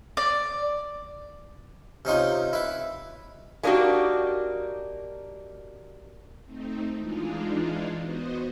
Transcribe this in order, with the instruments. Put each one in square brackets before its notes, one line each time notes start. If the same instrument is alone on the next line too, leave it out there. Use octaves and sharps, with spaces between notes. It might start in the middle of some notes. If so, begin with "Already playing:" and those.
[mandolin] D5
[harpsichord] C3 C#4 D#4 F4
E4 B4
[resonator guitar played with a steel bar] G#3 A#3 D4 D#4 F#4 G4
[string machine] A3 C4 D#4
E3 G#3 D4 D#4 F4
B3 F#4 C5 D#5